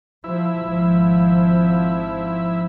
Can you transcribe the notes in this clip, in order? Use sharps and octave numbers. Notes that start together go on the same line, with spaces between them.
F3 E4
G#1 F3